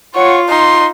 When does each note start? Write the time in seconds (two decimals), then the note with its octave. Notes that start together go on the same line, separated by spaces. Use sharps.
0.15 F4 C#5 F#5
0.49 D#4 C6